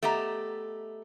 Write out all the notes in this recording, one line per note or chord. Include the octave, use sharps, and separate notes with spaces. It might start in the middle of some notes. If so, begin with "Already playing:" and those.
A3 B3 G4 D#5 A#5